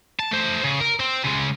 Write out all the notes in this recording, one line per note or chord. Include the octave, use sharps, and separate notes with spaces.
A5
A3 C5
C#3
A#4
C4
C#3 G#3